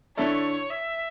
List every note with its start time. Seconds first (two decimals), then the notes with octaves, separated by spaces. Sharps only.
0.17 D3 A3 E4 A4 C#5 D5
0.70 E5